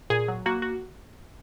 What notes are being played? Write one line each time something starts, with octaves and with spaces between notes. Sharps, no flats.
A#2 G#4
F#3
A#3 F#4
F#4